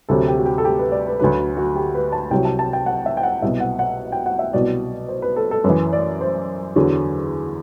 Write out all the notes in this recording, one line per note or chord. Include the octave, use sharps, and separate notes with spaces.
D2 C3 F#3 A4
G4
F#4
G4
A4
G4
B4
D5
B4
D2 D3 F#3 B4
F#4
G4
B4
A5
C2 C3 F#3 G5
A5
A5
G5
F#5
E5
G5
F#5
C2 B2 F#3 E5
F#5
F#5
G5
F#5
E5
C2 B2 F#3 D5
C5
B4
A4
A4
F#2 B4
E3
D5
C5
E2 D3 F#3